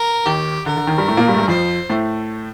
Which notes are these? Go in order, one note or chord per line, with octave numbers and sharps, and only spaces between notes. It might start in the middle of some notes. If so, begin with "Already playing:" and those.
Already playing: A#4
D#2 D#3 G4
D3 A#4
D3
D#2 D#3
G2 G3
A2 A3
A#2 A#3
G2 G3
A3
G2 G3
F2 F3 C5
A2 A3